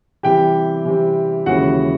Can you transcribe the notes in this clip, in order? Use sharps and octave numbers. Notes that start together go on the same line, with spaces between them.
C3 E3 G3 C4 G4 G5
C3 E3 G3 C4
D#2 C#3 E3 G#3 F#4 F#5